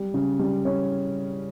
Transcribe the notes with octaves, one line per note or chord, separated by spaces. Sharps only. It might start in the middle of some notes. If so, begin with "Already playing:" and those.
Already playing: G3
C#3
G3
C#4